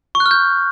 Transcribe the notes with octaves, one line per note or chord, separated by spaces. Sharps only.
C#6
F#6
F6
G6